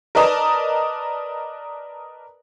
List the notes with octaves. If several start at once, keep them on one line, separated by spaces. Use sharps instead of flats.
A#4 B4 D5 D#5 A5 A#5